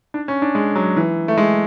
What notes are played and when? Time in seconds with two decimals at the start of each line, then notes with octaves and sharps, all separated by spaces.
0.14 D4
0.28 C#4
0.42 D4
0.55 G#3
0.75 F#3
0.97 E3
1.28 A3
1.37 G#3